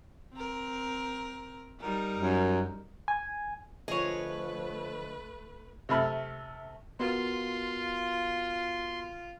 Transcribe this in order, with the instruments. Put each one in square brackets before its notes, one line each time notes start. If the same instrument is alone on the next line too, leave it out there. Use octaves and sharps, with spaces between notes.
[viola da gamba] C4 A#4
G3 D#4 A#4
[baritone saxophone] F#2
[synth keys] G#5
[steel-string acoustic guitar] D2 F4 D#5 [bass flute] F3 [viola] A3 B4 [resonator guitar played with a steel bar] G#4 C#5
[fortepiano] C3 A3 B5 F6
[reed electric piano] B3 F#4 A#4 [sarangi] F4 [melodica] C6